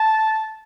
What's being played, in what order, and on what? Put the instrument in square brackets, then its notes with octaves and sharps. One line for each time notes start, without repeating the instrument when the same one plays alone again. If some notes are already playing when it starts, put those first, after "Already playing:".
Already playing: [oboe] A5